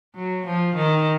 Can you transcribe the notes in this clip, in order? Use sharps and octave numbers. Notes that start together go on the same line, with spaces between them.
F#3
F3
D#3